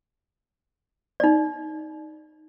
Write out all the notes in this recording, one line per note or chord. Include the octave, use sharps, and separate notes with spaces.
D#4 D5